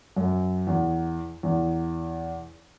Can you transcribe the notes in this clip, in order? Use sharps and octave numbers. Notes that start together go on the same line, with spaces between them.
F#2
E2
E2